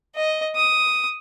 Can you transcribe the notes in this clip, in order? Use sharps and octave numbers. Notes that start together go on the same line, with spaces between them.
D#5
D#6